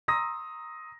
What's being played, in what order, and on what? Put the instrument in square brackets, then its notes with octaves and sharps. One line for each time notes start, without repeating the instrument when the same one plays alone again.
[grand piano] A#5 C6 D#6 E6 A#6